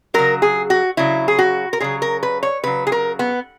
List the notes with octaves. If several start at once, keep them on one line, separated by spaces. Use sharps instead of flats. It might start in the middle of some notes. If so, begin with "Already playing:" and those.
C#3 F#3 A#4
G#4
F#4
C#3 F#3 E4
G#4
F#4
A#4
C#3 F#3 G#4
A#4
B4
C#5
C#3 F#3 B4
G#4
A#4
B3